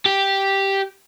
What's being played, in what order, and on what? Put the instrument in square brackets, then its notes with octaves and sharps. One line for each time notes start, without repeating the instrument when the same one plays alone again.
[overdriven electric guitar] G4